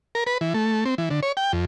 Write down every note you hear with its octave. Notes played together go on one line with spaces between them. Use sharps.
A#4
B4
E3
A3
C4
E3
D3
C#5
G5
F2